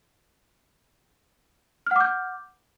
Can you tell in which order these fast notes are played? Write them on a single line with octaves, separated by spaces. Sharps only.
F6 F#5 D6 G6